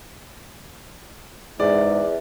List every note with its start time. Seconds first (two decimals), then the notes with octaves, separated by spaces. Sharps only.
1.60 E2 G#2 D5 E5